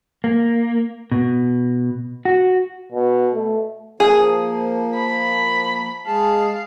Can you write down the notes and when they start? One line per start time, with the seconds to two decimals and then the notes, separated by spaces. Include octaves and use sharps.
0.24 A#3
1.12 B2
2.25 F#4
2.92 B2
3.34 A3
4.00 F3 A#3 G#4
4.95 B5
6.07 G#3 G#4 F5 A5